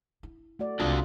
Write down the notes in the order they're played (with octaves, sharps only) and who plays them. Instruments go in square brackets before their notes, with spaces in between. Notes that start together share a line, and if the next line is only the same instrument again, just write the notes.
[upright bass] E4
[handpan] A3 F#4 D5
[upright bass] C2 [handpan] G#3 C4 F4 [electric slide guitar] D4 F#4 D5